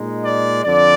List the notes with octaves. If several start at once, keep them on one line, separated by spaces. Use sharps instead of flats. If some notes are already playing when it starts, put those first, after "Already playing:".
Already playing: A#2 G#3 D#4
D5
F2 D3 D5